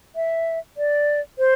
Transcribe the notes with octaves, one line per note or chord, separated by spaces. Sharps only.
E5
D5
C5